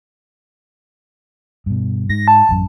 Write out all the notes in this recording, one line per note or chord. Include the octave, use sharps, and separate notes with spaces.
G2 B2
G#2 A#6
A5
A1 F#2